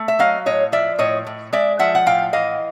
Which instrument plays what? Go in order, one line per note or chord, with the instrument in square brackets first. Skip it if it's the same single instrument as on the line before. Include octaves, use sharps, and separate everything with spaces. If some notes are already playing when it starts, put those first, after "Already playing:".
Already playing: [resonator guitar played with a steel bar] A3
E5
F#3 D#5 F5
A2 C#5 D#5
F3 D5 E5
A2 C#5 D#5
A2
G#3 D5 E5
F3 E5 F#5
F#5
A2 F5 G5
E3 D#5 F5